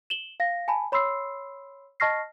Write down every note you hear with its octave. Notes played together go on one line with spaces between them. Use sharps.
E7 F#7 G7
F5 A#6
G#5 A5 B5
C#5 B5 C6 E6 C7
D#5 A5 C#6 F6 A#6 C7